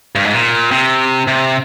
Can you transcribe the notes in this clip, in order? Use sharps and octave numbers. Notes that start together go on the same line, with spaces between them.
G2
G#2
A#2
C3
C3